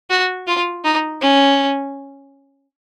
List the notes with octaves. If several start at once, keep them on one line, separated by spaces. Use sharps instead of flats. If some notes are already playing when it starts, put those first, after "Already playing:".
F#4
F4
D#4
C#4